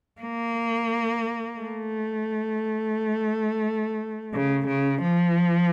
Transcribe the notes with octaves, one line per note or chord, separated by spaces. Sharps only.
A#3
A3
C#3
C#3
F3